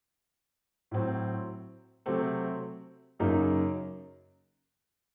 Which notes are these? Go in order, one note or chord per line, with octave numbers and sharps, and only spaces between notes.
A2 F#3 C4
C3 F#3 A3 C4
F#2 C#3 F#3 A#3 D#4